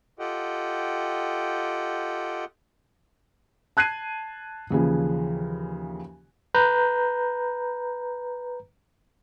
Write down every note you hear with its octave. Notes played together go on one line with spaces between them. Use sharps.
F4 G4 A4 D#5 F#5 G5
A5 F#6 G#6 C7 D#7
D#2 C#3 E3 F3
B4 A#5 G6